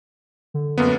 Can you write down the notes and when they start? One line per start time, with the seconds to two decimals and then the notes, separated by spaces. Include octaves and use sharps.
0.54 D3
0.78 F#2 A#3 B3